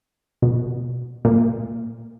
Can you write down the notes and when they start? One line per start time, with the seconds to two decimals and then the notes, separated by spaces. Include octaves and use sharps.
0.42 B2
1.25 A#2